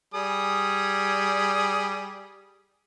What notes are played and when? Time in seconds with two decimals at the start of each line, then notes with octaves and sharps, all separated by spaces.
0.14 G3 G#4 D#6